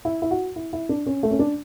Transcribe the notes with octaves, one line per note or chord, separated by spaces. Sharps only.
E4
E4
F#4
E4
E4
D4
C#4
A3
C#4
D4